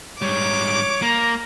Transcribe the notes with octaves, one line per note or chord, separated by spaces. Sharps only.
G#2 G3 C#5 D6
A#3 A#5